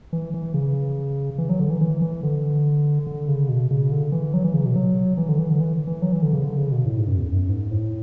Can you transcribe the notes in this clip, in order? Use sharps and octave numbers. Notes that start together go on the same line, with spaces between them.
E3
E3
C#3
E3
F#3
D3
E3
E3
E3
D3
D3
C#3
B2
C#3
D3
E3
F#3
E3
C#3
B2
F#3
E3
D3
E3
D3
E3
E3
F#3
E3
D3
C#3
D3
C#3
B2
A2
G#2
F#2
E2
F#2
G#2
A2